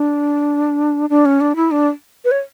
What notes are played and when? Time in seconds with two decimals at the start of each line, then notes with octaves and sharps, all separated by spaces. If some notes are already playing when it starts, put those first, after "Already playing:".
Already playing: D4
1.10 D4
1.25 C#4
1.41 D4
1.56 E4
1.71 D4
2.25 B4
2.31 C#5